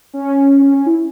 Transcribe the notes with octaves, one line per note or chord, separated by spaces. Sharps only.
C#4
C#4
C#4
E4